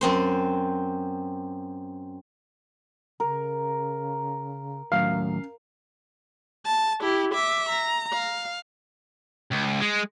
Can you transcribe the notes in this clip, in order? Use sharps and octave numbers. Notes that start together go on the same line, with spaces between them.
F#2 C4 C5
C#3 A#4
D#2 A2 F#3 C#4 F5
A5
E4 G4
E5 D6
A#5
F5
C#2
G#3